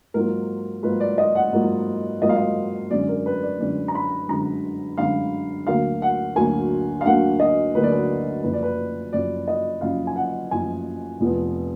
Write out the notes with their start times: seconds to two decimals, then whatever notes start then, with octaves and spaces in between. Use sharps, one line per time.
0.14 G#2 F#3 A#3 F4 A#4
0.83 G#2 F#3 A#3 F4 B4
1.00 D5
1.18 D#5
1.35 F#5
1.53 G#2 F#3 A#3 F4
2.22 G#2 F#3 A#3 F4 D#5
2.29 F5
2.36 D#5
2.91 F#2 D3 G#3 D5
3.09 A#4
3.26 B4
3.43 D5
3.60 F#2 D3 G#3 D5
3.88 A#5
3.95 B5
4.28 F#2 D3 G#3 A#5
4.98 F#2 D3 G#3 F5
5.67 D2 D3 F#3 A#3 F5
6.02 F#5
6.36 D2 D3 F#3 A#3 G#5
7.01 F5
7.05 D2 D3 F#3 A#3 F#5
7.40 D#5
7.74 D2 D3 F#3 A#3 B4
7.83 D5
7.92 B4
8.43 F#1 F#2 F3 B4
8.53 D5
8.63 B4
9.13 F#1 F#2 F3 D5
9.48 D#5
9.81 F#1 F#2 F3 F5
10.07 G#5
10.16 F#5
10.51 F#1 F#2 F3 G#5
11.20 F1 F2 F3 B3